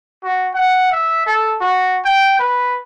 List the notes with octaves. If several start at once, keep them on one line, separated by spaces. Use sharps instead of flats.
F#4
F#5
E5
A4
F#4
G5
B4